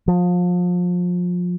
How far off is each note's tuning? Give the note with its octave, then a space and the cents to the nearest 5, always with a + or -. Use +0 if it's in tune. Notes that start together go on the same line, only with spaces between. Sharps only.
F3 +30